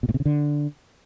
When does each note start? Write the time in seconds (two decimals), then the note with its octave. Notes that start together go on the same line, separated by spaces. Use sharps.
0.03 B2
0.09 A2
0.14 C3
0.20 C#3
0.25 D3